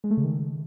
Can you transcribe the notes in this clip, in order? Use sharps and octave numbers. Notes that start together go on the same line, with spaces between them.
G#3
A3
C#3
D#3